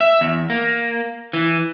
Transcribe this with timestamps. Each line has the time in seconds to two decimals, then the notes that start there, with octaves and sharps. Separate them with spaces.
0.01 E5
0.21 E2
0.50 A#3
1.33 E3